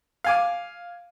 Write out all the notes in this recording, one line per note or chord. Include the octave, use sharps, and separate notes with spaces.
F5 G#5 D6